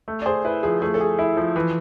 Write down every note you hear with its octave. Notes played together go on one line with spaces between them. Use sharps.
A3
D5
G#4 C5
E4 B4
F3 G#4
A3 G#4
A4
G#4
E4
F3
E3